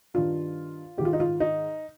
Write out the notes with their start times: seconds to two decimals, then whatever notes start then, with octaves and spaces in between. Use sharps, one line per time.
0.14 G2 D#3 F4
0.98 G#2 G4
1.01 D#3 F4
1.13 D#4
1.20 F4
1.40 D#4